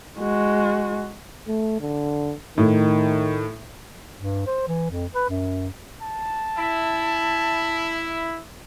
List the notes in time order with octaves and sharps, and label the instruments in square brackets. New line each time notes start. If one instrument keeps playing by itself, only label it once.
[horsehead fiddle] G#3 F#4
[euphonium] A3
D3
[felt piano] A2 [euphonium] D#3
[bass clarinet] G2
C5
E3
F2
B4
F#2
[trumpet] A5
[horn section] E4